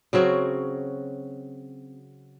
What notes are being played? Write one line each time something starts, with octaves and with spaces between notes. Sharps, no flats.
C#3 F#3 C4 F#4